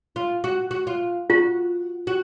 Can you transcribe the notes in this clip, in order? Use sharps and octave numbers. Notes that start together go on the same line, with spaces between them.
F4
F#4
F#4
F4
F4 F#4
F#4